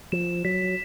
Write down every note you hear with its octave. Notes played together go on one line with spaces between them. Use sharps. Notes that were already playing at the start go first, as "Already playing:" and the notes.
F3 E7
F#3 B6